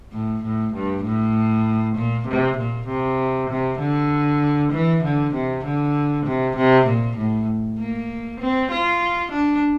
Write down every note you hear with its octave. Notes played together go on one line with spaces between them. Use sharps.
A2
A2
G2
A2
A#2
C3
A#2
C3
C3
D3
E3
D3
C3
D3
C3
C3
A#2
A2
A#3
C4
F4
D4